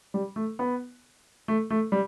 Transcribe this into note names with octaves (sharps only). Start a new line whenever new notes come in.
G3
A3
B3
A3
A3
G3